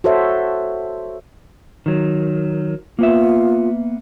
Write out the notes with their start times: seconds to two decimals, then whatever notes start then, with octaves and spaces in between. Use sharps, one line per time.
0.04 F#4 A4 C5 C#5 E5
1.86 D#3 F#3
2.99 A#3 B3 F4 E5